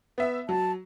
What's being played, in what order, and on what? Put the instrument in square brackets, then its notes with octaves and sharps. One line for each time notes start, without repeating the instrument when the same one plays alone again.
[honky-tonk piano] B3 E5
[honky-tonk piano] F#3 [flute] A5